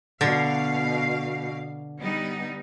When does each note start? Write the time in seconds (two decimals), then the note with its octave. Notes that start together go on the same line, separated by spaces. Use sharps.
0.21 B2 D3 F5
1.99 G3 B3 D#4